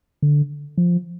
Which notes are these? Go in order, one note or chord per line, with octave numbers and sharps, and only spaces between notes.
D3
F3